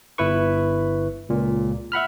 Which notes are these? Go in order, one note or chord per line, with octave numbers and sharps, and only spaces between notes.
G1 E4 B4 C#6
C#2 A#2
E5 F#5 B5 F6